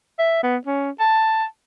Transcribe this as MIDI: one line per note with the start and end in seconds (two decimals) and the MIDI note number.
0.19 0.38 76
0.43 0.57 59
0.66 0.90 61
1.00 1.44 81